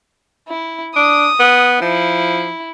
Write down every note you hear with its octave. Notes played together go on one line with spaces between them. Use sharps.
E4
D4 D#6
B3
F3 E4